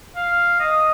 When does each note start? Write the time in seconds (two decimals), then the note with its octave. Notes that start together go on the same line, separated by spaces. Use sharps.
0.16 F5
0.60 D#5